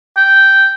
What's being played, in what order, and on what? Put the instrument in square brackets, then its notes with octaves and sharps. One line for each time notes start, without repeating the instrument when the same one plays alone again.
[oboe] G5